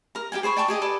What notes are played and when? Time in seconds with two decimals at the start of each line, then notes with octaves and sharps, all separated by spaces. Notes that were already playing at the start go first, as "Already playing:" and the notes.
0.15 A#4 A#5
0.32 G4 E5 G5 G#5
0.43 G#4 C5 B5 C#6
0.57 D5 G5 A5 C#6
0.68 G4 G#4 D#5 G#5
0.82 A4 B4 D5 G#5